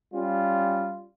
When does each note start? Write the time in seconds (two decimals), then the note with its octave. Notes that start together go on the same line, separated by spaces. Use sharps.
0.14 G3 C#4 F4